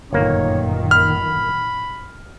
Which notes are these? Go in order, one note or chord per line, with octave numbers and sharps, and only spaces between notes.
G1 F#2 A#2 D#3 A#3 C#5
B5 F6